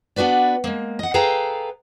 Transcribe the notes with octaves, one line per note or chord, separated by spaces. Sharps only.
B3 D4 F#4 B4 D5
G#3 A#3
D#5 F#5
G#4 A4 B4 F5 G5 A#5